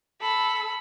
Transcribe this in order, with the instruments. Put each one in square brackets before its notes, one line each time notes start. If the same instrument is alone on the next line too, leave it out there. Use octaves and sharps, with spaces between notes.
[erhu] A4 [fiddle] B5